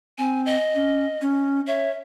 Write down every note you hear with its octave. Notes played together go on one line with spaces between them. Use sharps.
C4 G#5
D#5
C#4
C#4
C#5 E5